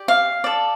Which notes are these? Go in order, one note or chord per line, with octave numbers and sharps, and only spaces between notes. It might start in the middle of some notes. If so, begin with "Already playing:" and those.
Already playing: G4 D5
F5
A4 D5